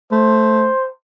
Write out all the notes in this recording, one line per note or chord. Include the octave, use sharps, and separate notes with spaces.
A3 C5